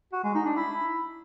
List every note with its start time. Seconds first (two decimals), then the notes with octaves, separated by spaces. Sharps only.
0.13 F#4
0.24 G#3
0.35 D#4
0.46 D4
0.56 E4